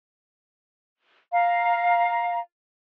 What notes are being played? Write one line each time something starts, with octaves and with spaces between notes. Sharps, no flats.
F5 A#5